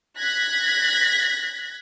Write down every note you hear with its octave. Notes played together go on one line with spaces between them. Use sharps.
F#6 G#6 A#6 B6